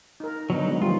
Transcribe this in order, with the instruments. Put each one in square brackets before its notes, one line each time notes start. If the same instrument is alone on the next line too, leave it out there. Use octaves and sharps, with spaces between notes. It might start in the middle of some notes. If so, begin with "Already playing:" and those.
[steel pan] D#4 A#4
[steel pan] D3 B3 D4 [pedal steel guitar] F#3 D#4
[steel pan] G#3 B3
[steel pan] D#3 F3 [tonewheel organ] G3 [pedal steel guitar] F4